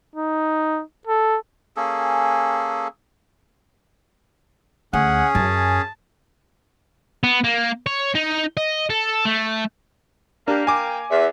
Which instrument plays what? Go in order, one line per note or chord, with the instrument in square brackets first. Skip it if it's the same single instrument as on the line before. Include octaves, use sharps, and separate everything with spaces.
[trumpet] D#4
A4
[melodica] A#3 C#4 G#4 A4
[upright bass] D2 [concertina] C#4 G#4 [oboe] F#5
[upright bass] F#2 [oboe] A5
[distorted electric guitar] B3
A#3
C#5
D#4
D#5
A4
A3
[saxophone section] A#3 [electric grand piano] D4 [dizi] G4
[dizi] G5 [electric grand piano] G#5 D6
[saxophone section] E2 [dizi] E5